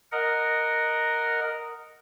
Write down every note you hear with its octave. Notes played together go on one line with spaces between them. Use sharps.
A#4 D#5 F#5